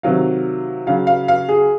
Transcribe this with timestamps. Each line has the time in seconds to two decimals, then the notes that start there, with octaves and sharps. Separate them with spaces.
0.03 C3 D#3 F#3 F5
0.87 C#3 F#3 F5
1.07 F5
1.28 F5
1.49 G#4